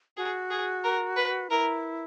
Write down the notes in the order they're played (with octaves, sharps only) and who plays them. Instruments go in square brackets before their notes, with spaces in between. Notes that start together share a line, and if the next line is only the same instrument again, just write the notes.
[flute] F#4 [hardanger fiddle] G#4
[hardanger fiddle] G#4
A#4
B4
[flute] E4 [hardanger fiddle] A#4